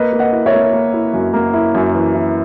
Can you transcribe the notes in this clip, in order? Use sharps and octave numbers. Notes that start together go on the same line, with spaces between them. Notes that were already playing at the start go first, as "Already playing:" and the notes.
Already playing: A#3 B4 D#5
A#3
D#5 F#5
E4
C#5 E5
A#3
A#3
E4
F#2
A#3
E4
F#2
E3
E4